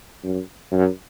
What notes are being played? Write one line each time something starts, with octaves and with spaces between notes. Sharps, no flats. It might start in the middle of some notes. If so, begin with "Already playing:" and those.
F#2
F#2